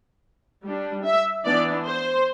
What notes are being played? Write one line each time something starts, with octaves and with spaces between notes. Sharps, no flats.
G3 D4
E5
E3 B3 D4 D5
C5